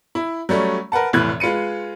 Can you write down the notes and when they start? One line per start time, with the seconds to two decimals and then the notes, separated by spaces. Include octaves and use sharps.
0.15 E4
0.49 F#3 G3 A3 C#4
0.92 A#4 B4 F#5 A5
1.13 F1 A2 E3 F#6 G#6
1.40 G#3 F4 B4 C#7 D#7